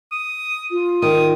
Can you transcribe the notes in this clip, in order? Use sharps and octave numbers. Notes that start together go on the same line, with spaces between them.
D#6
F4
D#3 D#6